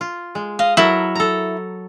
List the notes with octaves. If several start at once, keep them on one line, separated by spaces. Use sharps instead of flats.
F4
G#3
D#5 F5
F#3 E4 A#4 A5
A4 A#5